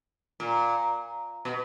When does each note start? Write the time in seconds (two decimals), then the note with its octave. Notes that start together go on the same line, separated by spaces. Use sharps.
0.40 A#2
1.45 B2